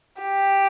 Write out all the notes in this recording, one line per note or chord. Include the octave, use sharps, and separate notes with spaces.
G4